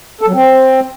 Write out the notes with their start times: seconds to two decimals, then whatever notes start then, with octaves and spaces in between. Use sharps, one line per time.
0.21 A4
0.28 F#3
0.34 C4